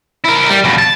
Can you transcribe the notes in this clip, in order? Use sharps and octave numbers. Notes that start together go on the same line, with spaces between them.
E4 A#4
G3
F2 B2
A5